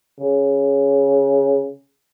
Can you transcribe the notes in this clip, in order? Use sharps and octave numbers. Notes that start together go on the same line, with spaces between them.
C#3